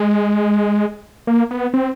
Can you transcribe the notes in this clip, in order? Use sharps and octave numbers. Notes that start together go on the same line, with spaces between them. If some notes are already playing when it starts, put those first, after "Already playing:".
Already playing: G#3
A#3
B3
C4